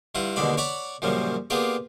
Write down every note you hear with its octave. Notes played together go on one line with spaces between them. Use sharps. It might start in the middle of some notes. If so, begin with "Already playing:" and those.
G2 E4 F4 F#5
D#2 B2 D3 G#3 D5 B5
C#5 D5 F#5 B5 C#6 D6
F#2 A#2 C#3 F3 G3
A#3 B3 F4 G4 G#4 D5